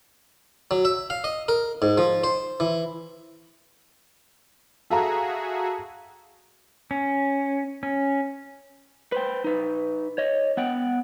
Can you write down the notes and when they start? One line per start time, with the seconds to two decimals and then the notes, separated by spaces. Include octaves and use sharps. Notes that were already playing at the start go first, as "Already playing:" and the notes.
0.71 F#3
0.85 E5
1.10 F5
1.24 D#5
1.48 A#4
1.82 G#2
1.98 F3
2.24 C5
2.60 E3
4.90 F#4 G#4 A4 E5 F5 A#5
6.91 C#4
7.83 C#4
9.12 B4 C5 G5
9.44 D#4 B4
10.18 C#5 D#5
10.57 B3 F#5 G5